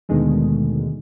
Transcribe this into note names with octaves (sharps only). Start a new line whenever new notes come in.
D#2 B2 D3 D#3 G#3 A3